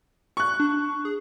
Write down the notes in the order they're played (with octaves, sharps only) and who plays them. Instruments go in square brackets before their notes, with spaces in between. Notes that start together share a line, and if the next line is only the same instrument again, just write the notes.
[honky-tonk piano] C#6 F#6
[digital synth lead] D4
G#4